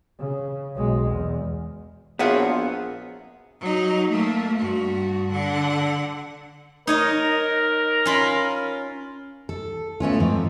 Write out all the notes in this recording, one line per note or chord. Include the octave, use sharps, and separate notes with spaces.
C#3
B1 G#3
E2
A#1 F#3 B3 C4 F4 G#4 E5 F#5
F#3 D#4
A3 A#3
G2 F#4
D3 F#5
D#4 A#4 C#5 D#5
C#4 F4 B5
A4
A3 B3 C#4 F4
G#2 F3 C4